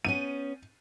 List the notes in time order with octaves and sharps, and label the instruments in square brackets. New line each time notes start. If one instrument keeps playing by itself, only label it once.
[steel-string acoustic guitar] B3 C#4 [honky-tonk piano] D#7